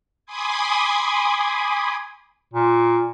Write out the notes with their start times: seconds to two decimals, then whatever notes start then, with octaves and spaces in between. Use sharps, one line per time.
0.26 G#5 B5 C6 D6 D#6 G#6
2.53 A#2